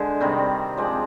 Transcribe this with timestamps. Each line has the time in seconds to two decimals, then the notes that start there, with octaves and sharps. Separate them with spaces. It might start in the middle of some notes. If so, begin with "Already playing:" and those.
Already playing: D3 G#3 D4 C5
0.20 C3 D#3 G3 C4
0.77 F3 G#3 C4 D5